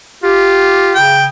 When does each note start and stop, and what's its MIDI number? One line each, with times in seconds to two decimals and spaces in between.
0.23 0.99 65
0.23 0.90 67
0.95 1.27 49
0.95 1.25 79